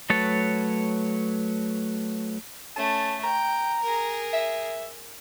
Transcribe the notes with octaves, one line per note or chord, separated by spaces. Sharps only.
F#3 A3 B4 C#5 A5
A3 C#4 A5
G5 A#5
G#4 A#4
E5